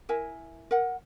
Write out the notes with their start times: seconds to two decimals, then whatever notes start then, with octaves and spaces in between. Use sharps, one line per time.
0.09 E4 A#4 E5 G#5
0.71 A#4 F#5